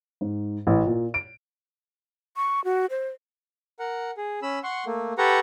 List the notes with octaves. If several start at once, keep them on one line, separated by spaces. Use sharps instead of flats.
G#2
A1
A#2
D7
C#6
F#4
C5
A#4 F#5
G#4
C#4 B5 E6
F#5 C6 C#6
A3 A#3
G4 A4 B4 F#5 A#5 C#6